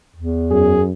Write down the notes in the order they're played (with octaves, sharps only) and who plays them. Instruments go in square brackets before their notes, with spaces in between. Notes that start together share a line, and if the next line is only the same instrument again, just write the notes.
[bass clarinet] E2
[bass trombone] F#2 [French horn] G#4